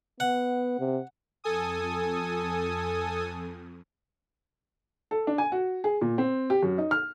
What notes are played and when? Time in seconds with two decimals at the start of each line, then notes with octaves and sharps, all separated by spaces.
0.20 B3 F#5
0.79 C3
1.44 F2 A4 G#5 D#6
5.11 A4
5.27 D4
5.38 G#5
5.52 F#4
5.84 G#4
6.01 A#2
6.18 C4
6.50 G4
6.63 F#2
6.78 D#4
6.91 F6